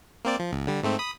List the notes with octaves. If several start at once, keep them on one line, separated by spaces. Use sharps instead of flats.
A#3 C4 D5
F3
C#2
D3 G3
G#2 A3 C4
B5 D#6